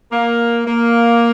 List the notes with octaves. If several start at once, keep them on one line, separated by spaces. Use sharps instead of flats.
A#3
A#3